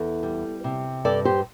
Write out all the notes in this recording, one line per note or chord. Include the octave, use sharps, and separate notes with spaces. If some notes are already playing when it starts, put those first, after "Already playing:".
Already playing: E2 A4
G3
C3
G2 A4 D5
G4 C5